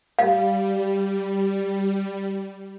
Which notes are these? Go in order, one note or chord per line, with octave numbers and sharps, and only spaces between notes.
G3 F5